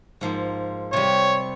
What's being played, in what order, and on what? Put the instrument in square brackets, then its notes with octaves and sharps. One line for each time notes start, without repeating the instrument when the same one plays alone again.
[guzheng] G#2 F3 A#3
[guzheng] C3 G3 [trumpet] C#5